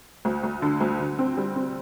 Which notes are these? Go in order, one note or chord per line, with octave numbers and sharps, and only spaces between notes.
D2
D2
D3
D2
D3
C4
G3
C4